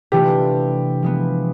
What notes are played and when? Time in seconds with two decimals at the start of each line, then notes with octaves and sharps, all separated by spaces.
0.12 C3 E3 A3 D4 F4 G4
1.02 F3 G#3 B3